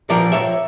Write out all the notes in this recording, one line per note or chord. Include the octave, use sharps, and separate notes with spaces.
A#2 F3 A#4 D5
C#5 E5